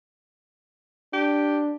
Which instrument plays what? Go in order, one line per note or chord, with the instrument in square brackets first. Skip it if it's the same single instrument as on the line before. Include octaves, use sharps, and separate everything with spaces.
[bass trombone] D4 [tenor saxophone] G4